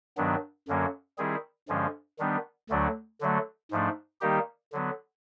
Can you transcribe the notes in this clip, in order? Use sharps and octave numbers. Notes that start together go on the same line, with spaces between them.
G2 D#3 F#3 B3 D4
F#2 D3 F#3 A#3 C#4
D#3 G3 C4 E4 G#4
G2 D3 F3 G#3 C#4
D#3 G3 B3 D4
D2 D3 F#3 A3 D4
D3 F#3 A3
G#2 F3 A3 D4
D#3 G3 A#3 D#4 G4
D3 F#3 B3